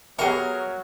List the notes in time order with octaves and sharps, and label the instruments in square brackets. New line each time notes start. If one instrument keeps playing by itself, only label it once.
[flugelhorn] F#3 [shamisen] B3 G4 E5 [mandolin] G#4 C#6 [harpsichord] A#4